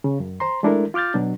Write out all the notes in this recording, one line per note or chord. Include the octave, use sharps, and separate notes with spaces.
C#3
F#2
C5 A#5 C6
G#3 A3 D4 E4 A4 A#4
F4 D6 F6 G6 A6
B2 F#3 D4